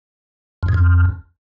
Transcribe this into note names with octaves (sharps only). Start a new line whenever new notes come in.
F2
G#2
F2